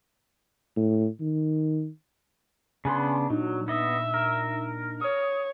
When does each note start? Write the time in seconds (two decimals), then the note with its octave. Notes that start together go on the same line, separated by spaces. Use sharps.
0.76 A2
1.20 D#3
2.85 C#3 B3 D4 G#5 B5 C6
3.30 A#2 F#3 D4 D#4
3.68 B3 D#5 E5
4.14 A#4
5.01 C#5 D#6